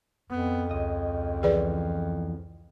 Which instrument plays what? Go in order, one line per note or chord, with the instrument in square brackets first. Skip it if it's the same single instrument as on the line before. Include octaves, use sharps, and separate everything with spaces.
[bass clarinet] F2 [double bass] B3
[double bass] C#2 [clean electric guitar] D#5
[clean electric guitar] E2 E3 F3 [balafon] G#4 B4 D5